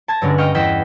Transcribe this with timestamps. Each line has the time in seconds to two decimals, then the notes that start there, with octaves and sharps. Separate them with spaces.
0.08 A5 G#6 A#6
0.22 G2 D3 G#3 C#4 D4
0.38 D#5 F5 G5 C#6 F6
0.54 E2 D#5 G5 A#6 B6 E7